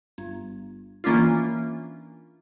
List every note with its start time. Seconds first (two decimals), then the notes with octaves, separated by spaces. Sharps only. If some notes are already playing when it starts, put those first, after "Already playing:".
0.18 G1
1.04 E3 A#3 C#4 D4 F4